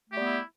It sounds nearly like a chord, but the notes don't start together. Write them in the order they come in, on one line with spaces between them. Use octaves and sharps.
A3 G4 G3 B3 E4